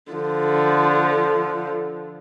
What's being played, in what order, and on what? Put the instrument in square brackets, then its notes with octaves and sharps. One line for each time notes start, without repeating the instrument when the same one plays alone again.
[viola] D3 F3